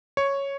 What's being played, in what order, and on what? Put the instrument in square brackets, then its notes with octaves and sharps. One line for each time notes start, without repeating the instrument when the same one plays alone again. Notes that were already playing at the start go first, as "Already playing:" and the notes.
[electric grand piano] C#5 C#6